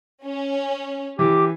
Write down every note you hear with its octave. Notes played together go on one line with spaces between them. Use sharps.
C#4
E3 G4 D6